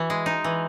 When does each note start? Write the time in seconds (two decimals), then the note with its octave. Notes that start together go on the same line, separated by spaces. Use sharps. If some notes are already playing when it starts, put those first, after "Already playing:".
Already playing: E3 F#4
0.10 G#3
0.26 D#4
0.44 E3